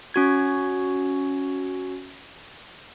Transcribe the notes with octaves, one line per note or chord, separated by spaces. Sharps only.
C#4 F#4 G#6